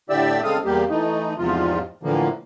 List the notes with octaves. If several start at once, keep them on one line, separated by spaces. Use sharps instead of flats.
A2 D3 G4 D5 E5 E6
C#3 G#3 C4 A4 F5 D#6
E2 G3 A#3 G4
E3 A3 D#4
E2 G#2 C3 F3 F4
A2 D3 E3 F3 A#3